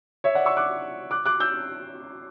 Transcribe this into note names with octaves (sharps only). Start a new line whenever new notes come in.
C#5 E5
D5 F#5
C#6 E6
D6 F#6
D6 F#6
D6 F#6
E6 G6